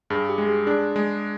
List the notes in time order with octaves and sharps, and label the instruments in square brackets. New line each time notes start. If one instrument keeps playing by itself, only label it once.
[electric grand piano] G2 [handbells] G#4
[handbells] G4
[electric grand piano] G#3
[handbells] G#4
[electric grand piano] D4 [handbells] G#4
[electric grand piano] G#3